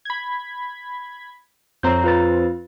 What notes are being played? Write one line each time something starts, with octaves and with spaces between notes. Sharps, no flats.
B5 G#6
F2 C4 C#5 A#5 G6
F4 B4 A6